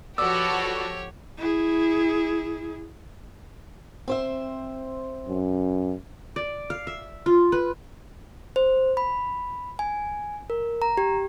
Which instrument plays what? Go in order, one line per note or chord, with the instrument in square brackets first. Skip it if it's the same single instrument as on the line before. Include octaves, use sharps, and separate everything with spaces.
[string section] F3 F#4 A4 [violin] G4 C#5 [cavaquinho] B4 D5 [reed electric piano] E6
[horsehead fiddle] E4 G#4
[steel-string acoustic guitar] C4 C5 E5
[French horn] F#2
[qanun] D5
F5
E5
F4
B4
[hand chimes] C5
B5
G#5
A#4
A#5
G4